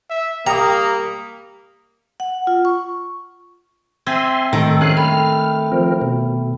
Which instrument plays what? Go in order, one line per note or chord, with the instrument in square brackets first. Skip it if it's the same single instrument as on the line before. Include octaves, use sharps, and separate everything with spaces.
[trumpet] E5
[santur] G3 D#6 [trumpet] A#3 [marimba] G5 [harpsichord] A#5
[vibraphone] F#5
F4
C#6
[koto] C4 [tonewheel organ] E5 G#5 C6
[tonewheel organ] A2 A4 [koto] D#3 [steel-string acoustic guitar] G5 A5
[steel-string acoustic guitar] F2 A3 C#4 [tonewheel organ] F5 G#5 F#6
[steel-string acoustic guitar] A3 [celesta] G5 B5 [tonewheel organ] F6
[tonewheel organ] F3 C4 A#4
B2